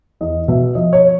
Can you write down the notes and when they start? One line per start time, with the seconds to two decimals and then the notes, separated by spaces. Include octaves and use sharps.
0.21 E2 D#5
0.48 B2 E5
0.75 F3 D#5
0.93 C#5